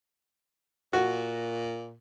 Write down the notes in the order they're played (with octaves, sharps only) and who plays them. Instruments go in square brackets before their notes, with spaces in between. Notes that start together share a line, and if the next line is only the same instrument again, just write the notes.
[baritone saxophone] A#2 [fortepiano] F#4